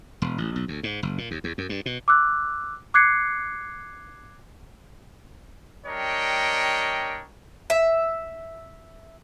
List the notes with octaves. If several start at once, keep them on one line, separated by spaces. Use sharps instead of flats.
E1
A1
B1
D2
G#2
F#1
A#2
D#2
E2
F#2
G2
B2
D6 E6 F#6
D6 F#6 G#6 C7 C#7
G3 D4 A#4 C#5 D#5 G5
E5